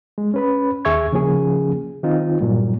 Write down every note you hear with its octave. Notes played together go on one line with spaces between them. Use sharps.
G#3
C#4 B4 B5
D#2 G#4 E5 C#6 G#6
C#3 F3 A#3 C#4 G#4
D#3 C4 D#4 F4
G2 A#2 F#3 G3